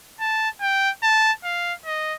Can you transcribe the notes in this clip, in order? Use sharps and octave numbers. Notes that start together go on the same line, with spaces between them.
A5
G5
A5
F5
D#5